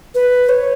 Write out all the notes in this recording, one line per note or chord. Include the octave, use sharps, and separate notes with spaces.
B4
C#5